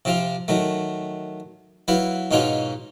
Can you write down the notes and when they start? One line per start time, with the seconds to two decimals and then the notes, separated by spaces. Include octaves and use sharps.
0.05 C3 F3 C4 F4
0.48 D#3 F#3 A3
1.88 F#3 E4 B4 F5
2.31 G#2 B2 C#4 D#4 F4 C#5